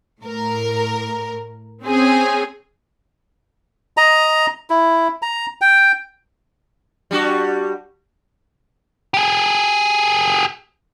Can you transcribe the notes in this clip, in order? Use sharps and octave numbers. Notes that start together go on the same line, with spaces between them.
A2 A#4
C4 C#4 G#4
D#5 A#5
E4
A#5
G5
G3 D4 F#4
G4 G#4